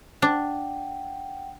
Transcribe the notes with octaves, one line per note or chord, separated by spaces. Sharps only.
D4 F#5 G5